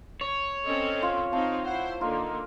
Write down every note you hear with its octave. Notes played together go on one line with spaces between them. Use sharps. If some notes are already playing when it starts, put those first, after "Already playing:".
C#5
C4 C#4 A4 D#5
F4
C4 D#4 F5 A5
E4 C5 F#5
D3 A#3 D#4 F4